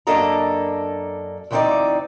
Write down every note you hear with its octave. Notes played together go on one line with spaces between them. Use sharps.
F#2 A#3 D4 A4 D#5 A#5
D2 E3 G3 C4 D#4 D5